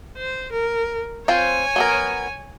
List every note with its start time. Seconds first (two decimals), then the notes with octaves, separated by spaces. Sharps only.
0.17 C5
0.52 A#4
1.28 C4 F4 C5 C#5 G#5
1.76 F#3 B3 A#4